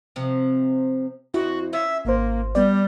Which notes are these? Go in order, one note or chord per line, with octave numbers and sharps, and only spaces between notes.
C3 F3
F2 E4 F#4
C#4 F4 E5
G#1 A#3 C5
G3 B3 D5